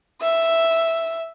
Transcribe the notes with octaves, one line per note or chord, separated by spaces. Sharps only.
E5